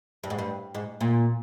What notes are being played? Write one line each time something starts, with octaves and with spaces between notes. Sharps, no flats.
G2
G#2
G2
G#2
A#2